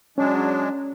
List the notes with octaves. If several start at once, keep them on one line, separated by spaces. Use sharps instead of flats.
F#3 G#3 C#4 D4